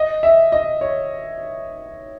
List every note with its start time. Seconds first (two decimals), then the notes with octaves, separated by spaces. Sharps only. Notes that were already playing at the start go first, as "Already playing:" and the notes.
Already playing: D#5
0.23 E5
0.52 D#5
0.81 C#5